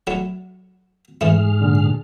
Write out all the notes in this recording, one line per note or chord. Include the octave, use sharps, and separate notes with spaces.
F#3 A3 E4
G#2 E3 A3 E4 G#4 F6
A#2 D3